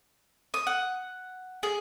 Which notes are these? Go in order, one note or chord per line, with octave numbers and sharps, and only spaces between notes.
D#6
F#5
G#4